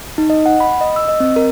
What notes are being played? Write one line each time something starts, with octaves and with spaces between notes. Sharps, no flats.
D#4
D#5
F#5
B5
D#5
E6
D#5
C4
A#4